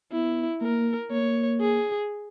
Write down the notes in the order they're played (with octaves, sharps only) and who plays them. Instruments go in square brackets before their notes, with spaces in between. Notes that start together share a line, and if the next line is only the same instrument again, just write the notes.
[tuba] B3 [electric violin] E4
[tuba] A#3 [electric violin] A#4
[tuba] A#3 [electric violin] C#5
[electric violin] G#4